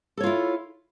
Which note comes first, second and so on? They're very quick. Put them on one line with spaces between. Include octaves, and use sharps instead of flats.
A4 C#5 F4 E4